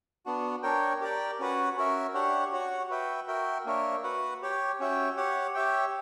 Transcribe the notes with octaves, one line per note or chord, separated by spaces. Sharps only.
B3 D4 F#4
D4 A#4 C#5 G5
G4 A#4 D5 G5
C#4 F#4 B4 F#5
C#4 F#4 A#4 E5
D4 G4 C#5 F#5
F#4 C#5 F#5
F#4 B4 E5 G5
F#4 A#4 E5 G5
A#3 D4 A#4 C#5 E5
F#4 B4 F#5
G4 C#5 G5
C#4 F#4 C#5 E5 G5
G4 C#5 F#5
G4 C#5 E5 G5